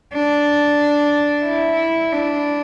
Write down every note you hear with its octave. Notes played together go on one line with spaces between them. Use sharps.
D4
E4
D4